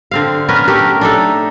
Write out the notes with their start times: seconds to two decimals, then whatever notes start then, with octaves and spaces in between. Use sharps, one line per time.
0.11 D3 C4 F5
0.49 B3 C#4 A#4 B4
0.68 A3 G4 A#4
1.01 D4 D#4 A4